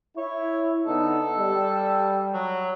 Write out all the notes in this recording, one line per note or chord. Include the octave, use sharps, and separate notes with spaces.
E4 C#5
D3 B3 D#4 A4
G3
F#3